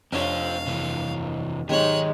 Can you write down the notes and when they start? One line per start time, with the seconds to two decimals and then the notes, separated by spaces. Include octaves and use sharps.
0.12 F1 C4 D4 F4 C#5 F5
0.67 C3 E3
1.69 B1 G#2 D#3 G#3 G4 C#5 F#6